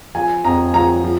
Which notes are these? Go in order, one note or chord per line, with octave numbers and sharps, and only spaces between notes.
F3 G#5
F2 A#5
F3 A#5
F3